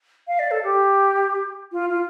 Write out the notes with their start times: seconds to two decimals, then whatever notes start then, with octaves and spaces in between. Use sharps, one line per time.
0.27 F5
0.39 D5
0.50 A4
0.63 G4
1.72 F4
1.89 F4